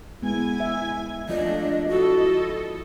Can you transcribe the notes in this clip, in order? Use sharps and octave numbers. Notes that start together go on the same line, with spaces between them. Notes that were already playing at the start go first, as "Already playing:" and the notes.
G#3 B3 E4 G#5
E5
F3 A3 D4 F4 D5 D#5
E4 F#4 A4 D#5